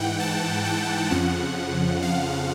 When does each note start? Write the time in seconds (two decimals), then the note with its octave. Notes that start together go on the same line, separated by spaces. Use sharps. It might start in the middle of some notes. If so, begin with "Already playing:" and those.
Already playing: G#2 E3 F#5 G5
0.20 A5
0.65 G5
1.11 F2 C#3 F3 F#5
2.03 F5